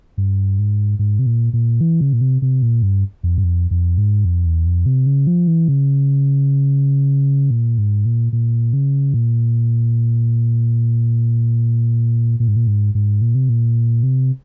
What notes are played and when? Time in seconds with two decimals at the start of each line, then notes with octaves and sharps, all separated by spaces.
0.18 G2
0.59 G#2
0.99 G#2
1.19 C3
1.26 A#2
1.53 A#2
1.81 E3
2.01 C#3
2.13 A#2
2.21 C3
2.42 C3
2.62 A#2
2.83 G2
3.23 F2
3.38 G2
3.44 F2
3.71 F2
3.98 G#2
4.25 F2
4.46 E2
4.66 F2
4.86 C3
5.06 C#3
5.27 F3
5.47 E3
5.68 C#3
7.51 A#2
7.78 G#2
8.05 A#2
8.33 A#2
8.73 C#3
9.14 A#2
12.40 A#2
12.48 G#2
12.56 A#2
12.67 G#2
12.95 G#2
13.22 A#2
13.35 C3
13.49 A#2
14.03 C3